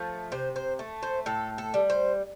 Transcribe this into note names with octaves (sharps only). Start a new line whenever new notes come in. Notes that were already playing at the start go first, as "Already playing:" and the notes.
Already playing: F3 A3
C3 C5
C5
A3
C5
A2 A4
A4
G3
C5